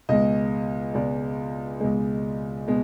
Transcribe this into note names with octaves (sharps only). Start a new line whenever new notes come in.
C#2 B2 G#3 D#5
C#2 B2 G#3 D5
C#2 B2 G#3
B2 G#3